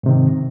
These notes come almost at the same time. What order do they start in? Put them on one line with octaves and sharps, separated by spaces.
G#2 C3 D#3